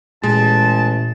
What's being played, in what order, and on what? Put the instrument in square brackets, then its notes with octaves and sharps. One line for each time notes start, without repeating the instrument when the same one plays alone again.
[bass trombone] A1 [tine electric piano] A#2 [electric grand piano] G#3 [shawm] A5